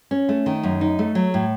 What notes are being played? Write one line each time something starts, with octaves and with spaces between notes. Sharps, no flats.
C#4
A3
D#3
F#2
D#4
A3
F#3
A2